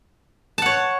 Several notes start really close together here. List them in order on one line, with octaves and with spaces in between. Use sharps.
A5 F#5 C#5